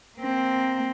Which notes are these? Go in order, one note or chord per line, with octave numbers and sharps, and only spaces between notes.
A#3 C4